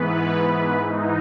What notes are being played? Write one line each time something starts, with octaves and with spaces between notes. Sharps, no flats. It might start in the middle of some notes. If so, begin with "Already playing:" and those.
Already playing: G#2 E3 B3 B4
G#2 E3 D#4